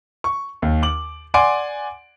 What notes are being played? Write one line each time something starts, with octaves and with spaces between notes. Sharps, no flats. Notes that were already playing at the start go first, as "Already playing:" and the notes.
C#6
D#2
D6 F#7
D5 F#5 G#5 C6 D6 D7